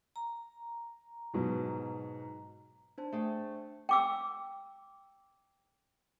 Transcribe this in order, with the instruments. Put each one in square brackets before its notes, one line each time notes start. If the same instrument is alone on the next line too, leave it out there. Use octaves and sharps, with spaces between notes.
[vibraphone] A#5
[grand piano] G#2 B2 F#3
[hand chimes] D4 C5 A5
[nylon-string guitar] A3 G#4 G5
[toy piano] G5 D6 E6